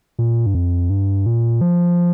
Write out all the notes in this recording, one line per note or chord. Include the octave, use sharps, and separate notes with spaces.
A#2
G2
F2
G2
A#2
F3